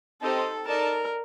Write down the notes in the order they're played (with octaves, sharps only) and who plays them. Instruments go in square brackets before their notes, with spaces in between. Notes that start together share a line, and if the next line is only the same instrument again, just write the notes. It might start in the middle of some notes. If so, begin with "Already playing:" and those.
[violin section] C4 D#4 G4 C5 D#5 [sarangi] A4
[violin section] D#4 A4 D5 A5 [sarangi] A#4